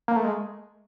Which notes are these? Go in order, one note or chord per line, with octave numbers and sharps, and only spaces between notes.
A#3
A3
G#3